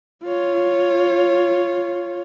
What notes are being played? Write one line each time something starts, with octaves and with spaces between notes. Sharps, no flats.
F4 C#5